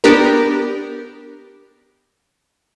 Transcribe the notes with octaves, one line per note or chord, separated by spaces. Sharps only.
B3 D4 G4 A#4